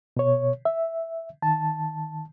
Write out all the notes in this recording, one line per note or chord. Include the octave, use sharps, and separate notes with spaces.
B2 C#5
E5
D#3 A5